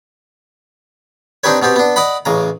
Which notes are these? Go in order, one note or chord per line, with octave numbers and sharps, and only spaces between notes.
C4 D4 D#4 G4 B4 C#5
B2 B3 C4 G4
B3 D4
D5 D#5 F#5 B5
A1 C#3 A#5